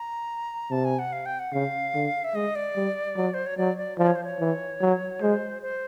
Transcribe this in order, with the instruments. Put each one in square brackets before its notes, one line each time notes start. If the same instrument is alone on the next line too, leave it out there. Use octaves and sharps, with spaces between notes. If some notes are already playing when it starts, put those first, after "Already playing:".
Already playing: [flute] A#5
[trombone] C3 [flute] A5
[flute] G#5
F#5
F5
G5
F#5
[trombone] C#3 [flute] F5
[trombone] D3
[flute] E5
[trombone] G#3 [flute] D#5
[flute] D5
[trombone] G3
F#3
[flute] C5
C#5
[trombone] F#3 [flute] D5
[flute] D5
[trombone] F3 [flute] D5
[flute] C#5
C5
C#5
[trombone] E3
F#3
[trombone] G#3 [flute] C5
[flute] C5